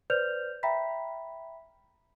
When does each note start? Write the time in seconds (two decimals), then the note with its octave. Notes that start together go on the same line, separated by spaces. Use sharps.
0.10 B4 C5 D5 F6 G6 F7
0.63 E5 G5 A#5 B5 B6